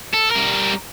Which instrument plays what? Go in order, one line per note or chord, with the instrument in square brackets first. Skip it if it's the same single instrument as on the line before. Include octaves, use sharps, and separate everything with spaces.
[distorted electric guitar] A4
G3 A#4